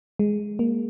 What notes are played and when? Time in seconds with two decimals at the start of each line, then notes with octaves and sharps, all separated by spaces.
0.19 G#3
0.59 A#3